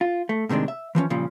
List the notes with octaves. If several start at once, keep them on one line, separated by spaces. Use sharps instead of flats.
F4
A3
A2 C3 D#3 G#3 D4
E5
E3 F3 A3 C#4
A#2 C#3 F3 G3